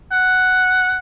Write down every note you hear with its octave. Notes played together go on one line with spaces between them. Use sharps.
F#5